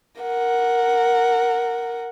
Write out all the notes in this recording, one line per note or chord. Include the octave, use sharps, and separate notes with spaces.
A#4 F#5